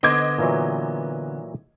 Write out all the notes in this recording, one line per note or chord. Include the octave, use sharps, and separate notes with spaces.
D3 B3 C5 D#5 D6 G#6
A#2 E3 F#3